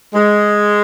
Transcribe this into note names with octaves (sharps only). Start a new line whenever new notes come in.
G#3